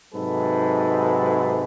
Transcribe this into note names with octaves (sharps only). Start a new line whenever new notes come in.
G#2 C3 F#3 A4 B4